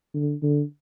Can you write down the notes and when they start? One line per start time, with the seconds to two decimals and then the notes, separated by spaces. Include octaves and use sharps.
0.14 D3
0.42 D3